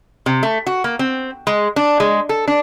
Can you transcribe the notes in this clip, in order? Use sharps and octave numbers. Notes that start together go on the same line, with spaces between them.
C3
A3
F#4
A#3
C4
G#3
D4
G#3
A4
D4